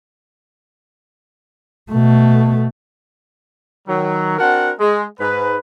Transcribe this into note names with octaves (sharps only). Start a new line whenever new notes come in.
B2 A3
D#3 F#3
C4 D4 F#4 A#4 F#5 A5
G#3
G#2 B4